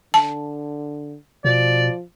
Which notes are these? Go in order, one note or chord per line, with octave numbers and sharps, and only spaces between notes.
D3 A5
B2 F3 D5